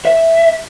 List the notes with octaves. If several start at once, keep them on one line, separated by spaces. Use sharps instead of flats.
E5